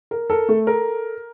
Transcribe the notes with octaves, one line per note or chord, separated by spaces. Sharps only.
A#4
A4 A#4
A3
A4 A#4